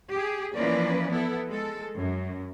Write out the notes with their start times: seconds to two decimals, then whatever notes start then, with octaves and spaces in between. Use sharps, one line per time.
0.11 G4 G#4
0.55 E3 F3 A#3 C#4 B4 D5
1.12 B3 E4 A4
1.48 G#3 A4
1.97 F#2